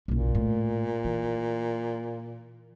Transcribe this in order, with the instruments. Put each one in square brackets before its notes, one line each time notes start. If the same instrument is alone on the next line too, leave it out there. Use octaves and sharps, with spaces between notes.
[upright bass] F#1 B1 [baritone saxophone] A#2
[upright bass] A2
E3